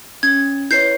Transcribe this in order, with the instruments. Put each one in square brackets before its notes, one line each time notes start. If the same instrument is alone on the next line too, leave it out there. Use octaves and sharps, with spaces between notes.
[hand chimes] C#4 [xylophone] G#6
[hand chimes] E4 B4 C#5 [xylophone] G6 C7